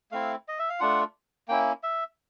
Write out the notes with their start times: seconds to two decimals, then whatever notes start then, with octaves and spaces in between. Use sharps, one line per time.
0.11 A3 C4 E4 F5
0.48 D#5
0.59 E5
0.69 F5
0.80 A3 D4 F4 F#5
1.48 A#3 C#4 E4 G5
1.83 E5